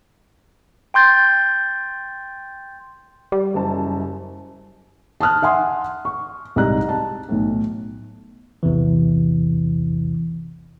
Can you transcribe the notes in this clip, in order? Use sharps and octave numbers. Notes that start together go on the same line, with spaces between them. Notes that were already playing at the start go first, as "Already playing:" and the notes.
G5 C6 G6 A6
G3
F#1 F#2 A5
A5 D#6 F6 F#6
E5 F#5 G#5 C6 D#6
C#6
C2 G#2 D#5 A#5 F#6
A5
B1 A2
A1 E2 C3 E3